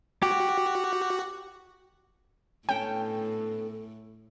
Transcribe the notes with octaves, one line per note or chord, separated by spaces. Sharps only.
F#4 G4
A2 D3 B3 C#4 A4 G5